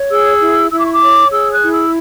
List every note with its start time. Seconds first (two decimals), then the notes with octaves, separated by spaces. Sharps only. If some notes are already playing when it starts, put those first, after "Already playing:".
Already playing: C#5
0.10 G#4 E6
0.41 E4
0.71 E4 E6
0.79 D6
0.86 C#6
0.93 D6
1.02 C#5
1.31 G#4 E6
1.53 F#6
1.62 E4
1.72 E6